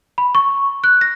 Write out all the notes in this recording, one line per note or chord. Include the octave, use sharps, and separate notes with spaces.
B5
C#6
F#6
A#6